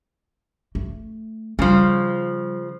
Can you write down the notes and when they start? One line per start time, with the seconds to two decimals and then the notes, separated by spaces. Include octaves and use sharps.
0.75 A3
1.59 C#3 F3 G3